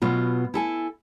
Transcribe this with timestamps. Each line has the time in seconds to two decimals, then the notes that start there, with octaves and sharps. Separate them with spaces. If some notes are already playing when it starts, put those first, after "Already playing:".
0.02 B2 F#3 B3 F4
0.54 E4 A4 G#5